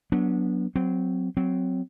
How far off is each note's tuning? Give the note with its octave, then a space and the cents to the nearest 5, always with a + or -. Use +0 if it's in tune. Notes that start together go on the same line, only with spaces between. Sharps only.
F#3 +0 B3 -25 D4 -20
F#3 +0 C4 -20
F#3 +0 C4 -15